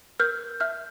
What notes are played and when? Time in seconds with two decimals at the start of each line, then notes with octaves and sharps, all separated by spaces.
0.20 A#4 F6 G6
0.60 E5 F6 G6